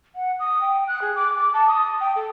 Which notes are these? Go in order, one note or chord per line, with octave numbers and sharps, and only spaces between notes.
F#5
D#6
G5
F#6
G#4
D6
D6
A5
D#6
G5
A4